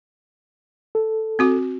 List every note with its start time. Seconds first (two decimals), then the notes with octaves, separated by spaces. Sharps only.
0.95 A4
1.39 C4 F#4 D6